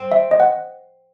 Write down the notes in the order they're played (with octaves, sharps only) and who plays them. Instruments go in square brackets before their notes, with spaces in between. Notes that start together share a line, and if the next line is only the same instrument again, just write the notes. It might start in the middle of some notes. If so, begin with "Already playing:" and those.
Already playing: [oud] C4
[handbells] E5
D#5
F#5